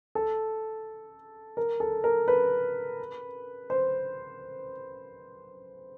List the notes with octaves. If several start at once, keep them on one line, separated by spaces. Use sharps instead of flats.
A4
A#4
A4
A#4
B4
C5